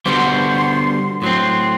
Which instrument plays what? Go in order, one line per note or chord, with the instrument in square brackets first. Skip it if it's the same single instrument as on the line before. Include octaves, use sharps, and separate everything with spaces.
[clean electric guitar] D3 G3 B3 F#4 C5 [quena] C6 D6
[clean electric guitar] A2 F#3 C4 [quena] C6